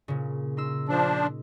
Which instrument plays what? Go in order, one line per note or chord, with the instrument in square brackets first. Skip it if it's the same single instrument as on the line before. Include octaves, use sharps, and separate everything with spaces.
[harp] A#2 C#3
D#4 C6 E6
[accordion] F3 D4